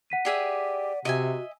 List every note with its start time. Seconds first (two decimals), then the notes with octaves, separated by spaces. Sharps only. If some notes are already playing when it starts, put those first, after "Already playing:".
0.10 F#5 B6 D#7
0.25 G4 G#4 D5 E5
1.05 C3 F#4 D#5 E5 G#5